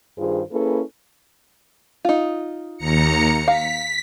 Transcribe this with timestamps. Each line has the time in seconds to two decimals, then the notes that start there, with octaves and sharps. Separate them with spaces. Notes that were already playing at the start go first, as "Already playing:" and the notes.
0.18 G2 D#3 F4 G#4 C5
0.52 A#3 C#4 E4 G#4 A4 B4
2.05 D#4 F4
2.77 D#2 A#5 C#7
3.48 F5 B6